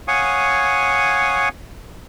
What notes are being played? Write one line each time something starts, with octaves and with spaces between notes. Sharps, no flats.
C#5 F5 F#5 G#5 C#6 D#6